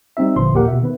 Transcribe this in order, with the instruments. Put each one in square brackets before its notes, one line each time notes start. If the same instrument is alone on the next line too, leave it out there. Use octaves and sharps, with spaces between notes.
[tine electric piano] G3 C4 D#4 E5
G1 A#2 D3 E3 F3 C6
A1 D#2 A#2 G4 A#4 F#5
B2 E5
D#3 B3 B4